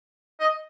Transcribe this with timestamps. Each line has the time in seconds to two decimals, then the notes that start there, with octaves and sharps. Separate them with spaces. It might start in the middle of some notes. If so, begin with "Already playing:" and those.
0.40 D#5